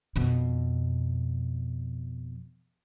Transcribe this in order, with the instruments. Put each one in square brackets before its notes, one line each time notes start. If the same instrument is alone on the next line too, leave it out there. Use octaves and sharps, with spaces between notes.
[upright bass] F2 B2